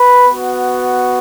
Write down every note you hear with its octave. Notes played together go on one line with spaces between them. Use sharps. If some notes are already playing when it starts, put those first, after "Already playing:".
Already playing: B4
B3 F#4